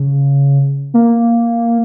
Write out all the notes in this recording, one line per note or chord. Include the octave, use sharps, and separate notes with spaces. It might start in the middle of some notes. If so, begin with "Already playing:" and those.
Already playing: C#3
A#3